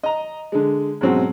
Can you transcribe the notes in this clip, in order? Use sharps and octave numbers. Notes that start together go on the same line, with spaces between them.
D#5 A#5
D3 G#3
G#2 B2 F#3 C4 C#4 F#4